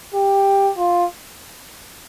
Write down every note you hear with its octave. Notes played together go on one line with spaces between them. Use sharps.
G4
F4